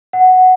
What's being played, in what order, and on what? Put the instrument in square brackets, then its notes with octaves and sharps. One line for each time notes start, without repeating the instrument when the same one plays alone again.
[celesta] F#5